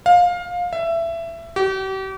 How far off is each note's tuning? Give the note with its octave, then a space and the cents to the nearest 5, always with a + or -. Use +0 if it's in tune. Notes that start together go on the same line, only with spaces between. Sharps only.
F5 +20
E5 +20
G4 -40